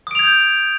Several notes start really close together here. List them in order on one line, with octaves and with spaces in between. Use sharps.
D#6 D7 F7 G#6 G6